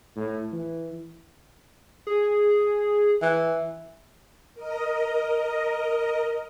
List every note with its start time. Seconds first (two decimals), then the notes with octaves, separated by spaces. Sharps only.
0.16 A2
0.52 E3
2.07 G#4
3.22 E3
4.55 A#4 D#5